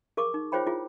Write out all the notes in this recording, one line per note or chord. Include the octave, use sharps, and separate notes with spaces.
G#4 A#4 C#6 D6
D#4
F4 G#4 C5 C#5 G5 B5
E4 F4 G#4